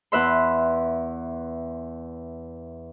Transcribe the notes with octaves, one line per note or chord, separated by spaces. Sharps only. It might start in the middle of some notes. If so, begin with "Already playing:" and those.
E2 B4 E5 C6